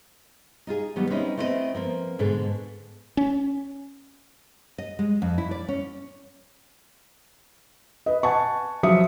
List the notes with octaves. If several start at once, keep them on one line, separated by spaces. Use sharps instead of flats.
D#4 F4 G#4
D#3 F#3 G3 B3
C4 C#4 D#4 E4
A3 B3 C4 E4 B4 D#5
F3 A#3 C4
G#2 B2 D3 G#4 A4
C#4
D#5
G#3
F2
E4
D5
C#4
B4 D#5
F#5 G#5 A5 C#6
F3 F#3 F4 E5 D#6 C#7